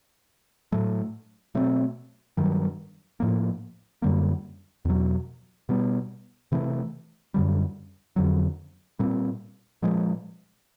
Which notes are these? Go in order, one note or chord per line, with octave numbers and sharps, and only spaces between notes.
A2 F#3 A3
B2 F#3 A3 C4
G2 D#3 F#3
A2 F3 A#3
F#2 D3 G3 A#3
E2 B2 F#3
B2 G3 B3
C3 E3 A3
F#2 D3 G3
F2 D3 F#3
A#2 G3 C4
A#2 F3 G#3